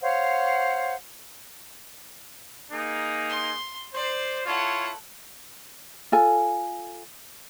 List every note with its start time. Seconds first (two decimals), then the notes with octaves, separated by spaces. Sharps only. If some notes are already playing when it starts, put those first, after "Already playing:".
0.02 C5 C#5 F5 F#5
2.71 A#3 D#4 G#4
3.29 C6
3.94 C5 D5
4.46 E4 F4 A4 C#5 F#5
6.12 F4 A4 G#5